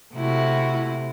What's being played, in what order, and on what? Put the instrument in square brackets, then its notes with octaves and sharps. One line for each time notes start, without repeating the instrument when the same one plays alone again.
[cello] C3 [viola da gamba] A3 E4 F#4